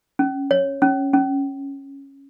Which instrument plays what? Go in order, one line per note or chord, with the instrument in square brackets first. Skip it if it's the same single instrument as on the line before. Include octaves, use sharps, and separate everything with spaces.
[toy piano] C#4
C#5
C#4
C#4